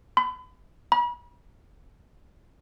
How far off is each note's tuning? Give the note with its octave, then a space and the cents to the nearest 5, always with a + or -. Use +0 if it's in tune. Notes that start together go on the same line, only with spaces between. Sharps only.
B5 +35
B5 -40